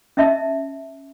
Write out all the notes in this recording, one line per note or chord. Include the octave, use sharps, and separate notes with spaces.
C#4 D#5 E5 A5